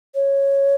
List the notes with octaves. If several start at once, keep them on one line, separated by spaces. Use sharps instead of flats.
C#5